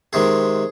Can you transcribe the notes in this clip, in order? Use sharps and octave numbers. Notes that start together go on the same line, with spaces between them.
C3 D#3 G#3 G#4